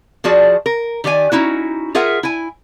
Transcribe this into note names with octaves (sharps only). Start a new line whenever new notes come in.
F3 F#4 G#4 D5 A5
A#4
D#3 G4 D5 G#5
C#4 D#4 E4 F#4
F4 G#4 A#4 E5 F#5
E4 G#5